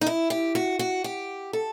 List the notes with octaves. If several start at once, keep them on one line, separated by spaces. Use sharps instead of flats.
D#4
E4
G4
F#4
F#4
G4
A4